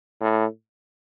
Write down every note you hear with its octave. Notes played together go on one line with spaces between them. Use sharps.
A2